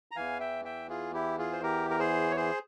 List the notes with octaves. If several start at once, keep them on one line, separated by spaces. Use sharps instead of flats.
A#5
E2 E3 F5 G#5
E5 G5
E5 G5
F4 G#4
E4 G4
F4 G#4
C5
G4 A#4
A#4
G#4 C5
C#5
G#4 C5